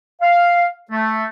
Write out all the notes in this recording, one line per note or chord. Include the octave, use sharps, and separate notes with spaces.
F5
A3